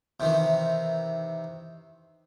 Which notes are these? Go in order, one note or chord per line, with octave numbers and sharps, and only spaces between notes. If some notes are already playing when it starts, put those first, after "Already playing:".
C3 D#3 E3